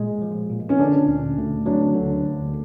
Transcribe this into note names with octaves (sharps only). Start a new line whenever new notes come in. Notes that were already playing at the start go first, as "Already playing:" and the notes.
Already playing: A#2 G#3
F3
A#2
C#4
D3 D4
D2
D2
F#3 D4
D3
D2